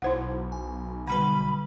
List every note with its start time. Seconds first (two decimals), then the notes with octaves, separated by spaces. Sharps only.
0.02 B1 E4 C5 F#5
0.52 G#5
1.07 D3 G3 B4 B5